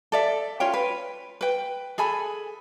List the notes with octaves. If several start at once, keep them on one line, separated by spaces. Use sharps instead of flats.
A4 D5 E5
C#4 F4 C#5 G5
B4
B4 G5
G#4 A4 G#5 B5